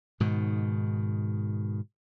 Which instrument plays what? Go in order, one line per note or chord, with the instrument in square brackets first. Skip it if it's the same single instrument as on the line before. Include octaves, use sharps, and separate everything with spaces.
[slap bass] G#2 B2 D#3